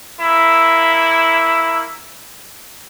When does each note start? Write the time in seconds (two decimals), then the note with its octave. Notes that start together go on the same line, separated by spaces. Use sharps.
0.19 A#3 E4